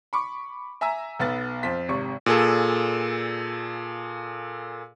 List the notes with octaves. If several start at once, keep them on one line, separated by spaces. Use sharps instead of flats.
B5 C#6 D6
E5 G#5 A#5 E6
B1 B3 A6
F2 C5 B6
G#1 C3 C#6
A#2 G#4 A4